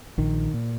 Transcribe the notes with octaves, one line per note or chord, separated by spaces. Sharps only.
A#1 D#3
A#2